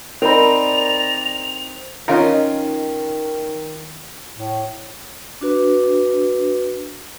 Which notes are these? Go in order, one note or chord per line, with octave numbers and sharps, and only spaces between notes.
C4 D#4 A#4 D5 A#5 B5 F7
D#3 C#4 D#4 F4 A#4
A2
D4 F#4 B4